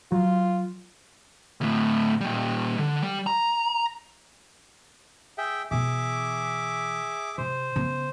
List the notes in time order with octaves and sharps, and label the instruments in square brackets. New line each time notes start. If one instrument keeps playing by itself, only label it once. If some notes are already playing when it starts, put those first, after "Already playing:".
[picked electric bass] F#3 [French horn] F4
[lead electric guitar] D2 A2
A#2 G3
D3
G3
A#5
[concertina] G#4 E5 G5
[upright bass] B2 E3 [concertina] G#4 E5 D6
[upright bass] C3 [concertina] C5
[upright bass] C#3 B3